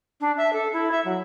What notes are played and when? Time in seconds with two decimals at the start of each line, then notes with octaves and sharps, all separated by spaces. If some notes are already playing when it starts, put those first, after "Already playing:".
0.21 D4
0.37 E5
0.53 A4
0.73 E4
0.91 E5
1.04 F#3